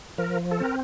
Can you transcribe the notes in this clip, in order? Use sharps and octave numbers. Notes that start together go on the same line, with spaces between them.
F3 A#4
A4
C4 A#4